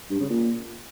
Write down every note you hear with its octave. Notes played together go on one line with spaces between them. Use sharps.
G2
C#3
A#2